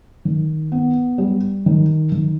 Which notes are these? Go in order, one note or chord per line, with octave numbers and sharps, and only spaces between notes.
D#3
B3
G3
D#3
D#3